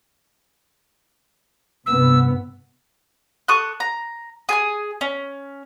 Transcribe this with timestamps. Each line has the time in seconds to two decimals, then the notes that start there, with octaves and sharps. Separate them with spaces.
1.86 G2 C3 B3 E6
3.48 A4 C#6 D#6 F#6
3.80 A#5
4.49 G#4 G#5 D#6
5.01 C#4